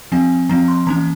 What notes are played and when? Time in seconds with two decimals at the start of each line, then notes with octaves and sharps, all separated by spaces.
0.12 F3 C4 G#5
0.49 F3 C4 A#5
0.68 C6
0.87 E3 A#3 C#4 A#5